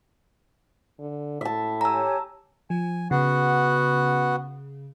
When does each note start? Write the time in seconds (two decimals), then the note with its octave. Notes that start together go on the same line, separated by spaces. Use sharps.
0.99 D3
1.41 A2 E5 A5
1.81 G4 C#5 G#5 A#5 E6
2.70 F3 G#5
3.11 C#3 B3 F#4 F#5